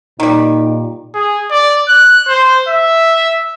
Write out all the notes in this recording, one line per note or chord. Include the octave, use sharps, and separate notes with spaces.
A#2 D#3 G3 D#4
G#4
D5
F#6
C5
E5